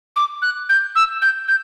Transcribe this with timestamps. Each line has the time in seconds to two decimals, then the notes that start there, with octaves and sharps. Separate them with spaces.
0.16 D6
0.42 F#6
0.69 G6
0.95 E6
1.22 G6
1.48 G6